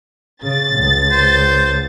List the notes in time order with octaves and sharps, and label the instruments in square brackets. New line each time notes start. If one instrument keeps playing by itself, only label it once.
[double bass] C#3 [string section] A6
[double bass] C#2
[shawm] C5